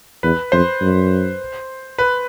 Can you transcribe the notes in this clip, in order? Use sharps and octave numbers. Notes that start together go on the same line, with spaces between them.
E2 B4
F2 C5
F#2
B4